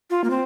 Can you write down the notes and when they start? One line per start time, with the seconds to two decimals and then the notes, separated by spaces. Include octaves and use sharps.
0.10 F4
0.24 A#3
0.30 C4